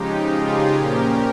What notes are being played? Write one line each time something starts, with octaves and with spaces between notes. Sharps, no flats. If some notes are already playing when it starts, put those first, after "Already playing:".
Already playing: C#3 F3 G#3 D#4 G4
F4 G#4
A#2 F3 A#3 C#4 G4 A#4